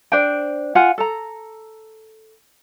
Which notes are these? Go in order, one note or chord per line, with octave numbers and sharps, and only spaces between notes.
D4 C5 G5
F4 F#5 G#5
A4 A#5